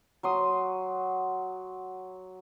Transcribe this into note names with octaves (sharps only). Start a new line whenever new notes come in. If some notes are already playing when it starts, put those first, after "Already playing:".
F#3 C6 D#6